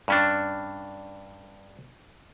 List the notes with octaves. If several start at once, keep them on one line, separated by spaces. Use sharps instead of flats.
G2 C#4 D4